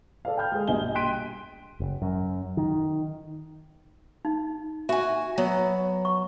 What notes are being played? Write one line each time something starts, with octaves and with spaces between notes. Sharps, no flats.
A4 D5 F5
G5 B5 F6 G6
G#3 G#4
A#1 G2 B2 D#5 G#5 G7
G5 C6 F#6 B6 D7 D#7
F#1
F#2
D#3
D#4
F#4 E5 G#5
F#3 B3
C#6